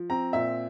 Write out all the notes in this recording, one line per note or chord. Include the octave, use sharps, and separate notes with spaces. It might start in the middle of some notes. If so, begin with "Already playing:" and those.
Already playing: F3
C4 A#5
A#2 E5